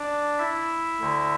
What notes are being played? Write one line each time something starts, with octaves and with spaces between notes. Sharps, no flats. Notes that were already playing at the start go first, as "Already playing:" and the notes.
Already playing: D4 D5
E4 E5
D2 D3